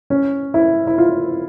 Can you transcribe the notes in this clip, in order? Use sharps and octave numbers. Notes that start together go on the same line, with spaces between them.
C#4
E4
E4
F4